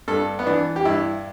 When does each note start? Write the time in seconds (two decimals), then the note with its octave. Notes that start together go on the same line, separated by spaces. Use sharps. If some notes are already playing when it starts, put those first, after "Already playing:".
0.08 G2 A4
0.39 B3
0.47 E3 D4
0.76 G4
0.85 G2 E4